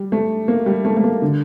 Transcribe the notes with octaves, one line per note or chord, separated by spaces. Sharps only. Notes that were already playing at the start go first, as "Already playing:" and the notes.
Already playing: G3
A3
A#3
G3
A3
A3
A#3
D3